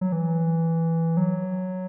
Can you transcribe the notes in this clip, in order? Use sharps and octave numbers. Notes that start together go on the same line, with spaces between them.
F#3
E3
F#3